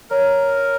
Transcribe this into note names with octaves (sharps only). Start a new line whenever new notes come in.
A#4 C#5